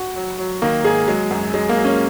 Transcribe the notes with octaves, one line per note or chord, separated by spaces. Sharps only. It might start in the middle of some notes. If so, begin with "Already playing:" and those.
Already playing: F#4
F#3
F#3
D#3 A#3
G#2 G#4
F#3 G#3
F#2
F#3 G#3
A#3
F#3
C#4